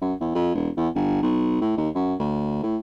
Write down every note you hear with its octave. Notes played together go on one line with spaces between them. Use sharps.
F#2
E2
F2
E1
E2
G1
B1
A2
D#2
F#2
D2
A2